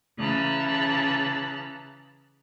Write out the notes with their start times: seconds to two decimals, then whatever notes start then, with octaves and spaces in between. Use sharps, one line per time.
0.18 C#3 E3 A5 A#5 E6 F#6